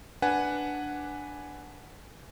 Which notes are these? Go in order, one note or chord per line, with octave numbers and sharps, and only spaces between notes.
D4 B4 F#5 G#5